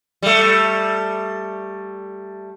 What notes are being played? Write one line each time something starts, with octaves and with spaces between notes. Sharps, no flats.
G3 A3